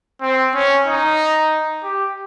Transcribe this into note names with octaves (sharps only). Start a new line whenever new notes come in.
C4
C#4
D#4
G4